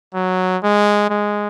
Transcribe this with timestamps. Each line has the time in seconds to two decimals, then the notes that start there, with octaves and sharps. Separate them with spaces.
0.15 F#3
0.63 G#3
1.10 G#3